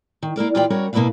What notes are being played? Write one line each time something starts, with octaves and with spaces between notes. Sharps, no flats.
D#3
A#3 E4 A#4 D5
A#2 E3 F4 G4 D5 G5
G3 C#4 F#4 A#4 C#5
B2 A#3 C#4 E4 B4 F5